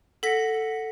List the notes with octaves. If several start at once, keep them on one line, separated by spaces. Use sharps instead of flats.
A4 F#5 A#6 B6 C#7